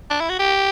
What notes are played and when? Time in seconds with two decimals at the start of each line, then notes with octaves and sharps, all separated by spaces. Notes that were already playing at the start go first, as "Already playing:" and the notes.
0.11 D4
0.21 E4
0.30 F#4
0.39 G4